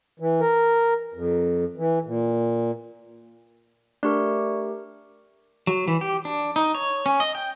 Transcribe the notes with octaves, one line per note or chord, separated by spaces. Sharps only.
E3
A#4
F2
E3
A#2
A3 D4 G4 A#4 D5 C#6
F#3
E3
G4
D4
D#4
C#5
C#4
D#5
G5